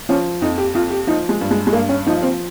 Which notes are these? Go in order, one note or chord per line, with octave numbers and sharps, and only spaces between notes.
F3 C#4
F2 D#4
G4
F2 F4
G4
F3 D#4
G#3
G2
G#3
G#3
G2 A#3
C#4
F3 D#4
C4